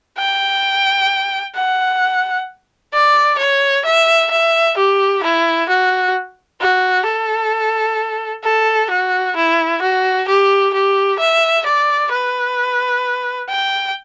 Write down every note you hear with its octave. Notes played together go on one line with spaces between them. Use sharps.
G5
F#5
D5
C#5
E5
E5
G4
E4
F#4
F#4
A4
A4
F#4
E4
F#4
G4
G4
E5
D5
B4
G5